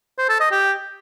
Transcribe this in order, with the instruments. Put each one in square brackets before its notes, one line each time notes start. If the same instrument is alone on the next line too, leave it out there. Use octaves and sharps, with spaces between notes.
[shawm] C5
A4
D#5
G4